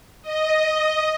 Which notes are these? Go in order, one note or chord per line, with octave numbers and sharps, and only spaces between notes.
D#5